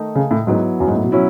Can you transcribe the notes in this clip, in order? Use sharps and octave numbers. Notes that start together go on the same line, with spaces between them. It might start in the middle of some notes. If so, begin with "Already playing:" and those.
Already playing: D#3 A3 D#4
C#3
A2
G#2 F#3 B3 E4
F#2
G#2
A2
B2
F#3 C#4 E4